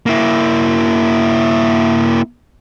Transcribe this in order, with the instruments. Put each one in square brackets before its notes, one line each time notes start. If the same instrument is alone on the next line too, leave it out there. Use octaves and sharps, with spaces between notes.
[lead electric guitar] A#3 E4